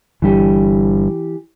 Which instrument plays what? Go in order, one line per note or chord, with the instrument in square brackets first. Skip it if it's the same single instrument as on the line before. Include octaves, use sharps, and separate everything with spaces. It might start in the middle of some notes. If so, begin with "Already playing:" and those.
[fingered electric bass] G1 G2 [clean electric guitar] E3 G4